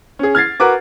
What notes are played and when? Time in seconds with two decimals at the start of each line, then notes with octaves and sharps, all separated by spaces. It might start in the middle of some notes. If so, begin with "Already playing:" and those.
0.19 C#4 G#4
0.35 F6 G#6 A6 C7
0.60 F#4 A#4 B4 D6